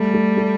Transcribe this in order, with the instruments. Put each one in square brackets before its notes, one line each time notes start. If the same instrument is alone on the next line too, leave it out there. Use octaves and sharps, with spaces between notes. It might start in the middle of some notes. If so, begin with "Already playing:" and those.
Already playing: [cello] G3 [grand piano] A3
[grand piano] A3
A3